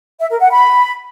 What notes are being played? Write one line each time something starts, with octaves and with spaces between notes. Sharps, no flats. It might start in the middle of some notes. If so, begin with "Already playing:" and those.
E5
A#4
F#5
B5